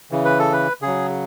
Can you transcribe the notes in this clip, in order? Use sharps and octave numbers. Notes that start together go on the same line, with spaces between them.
C#3 E3
B4
A4
B4
C#3 F#3 G#4